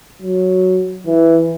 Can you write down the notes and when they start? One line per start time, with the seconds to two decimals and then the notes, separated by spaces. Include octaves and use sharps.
0.22 F#3
1.07 E3